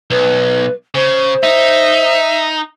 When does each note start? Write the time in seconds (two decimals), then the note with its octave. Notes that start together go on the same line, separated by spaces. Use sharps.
0.10 B1 B4
0.95 C#3 C5
1.43 D#4 E5